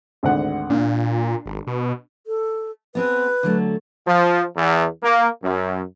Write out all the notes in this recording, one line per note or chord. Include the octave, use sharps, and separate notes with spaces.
G#1 D2 F#5
A#2 D4
G#1
B2
A4
B3 C4 G#4 B4
D3 F#3 A3
F3
E2
A#3
F#2